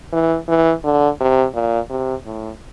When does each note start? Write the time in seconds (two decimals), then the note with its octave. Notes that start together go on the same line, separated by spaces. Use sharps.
0.13 E3
0.49 E3
0.84 D3
1.20 C3
1.55 A#2
1.90 C3
2.26 A2